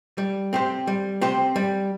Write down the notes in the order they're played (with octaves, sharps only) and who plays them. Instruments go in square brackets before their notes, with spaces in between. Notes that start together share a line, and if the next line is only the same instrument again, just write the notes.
[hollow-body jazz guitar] G3
C4 G4 C5
G3
C4 G4 C5
G3